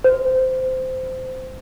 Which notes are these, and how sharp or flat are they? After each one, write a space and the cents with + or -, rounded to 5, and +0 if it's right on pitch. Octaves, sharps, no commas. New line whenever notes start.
C5 -15